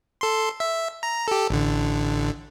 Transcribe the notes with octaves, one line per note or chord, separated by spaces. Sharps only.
A4 C6
E5
A#5
G4 A4
A1 D3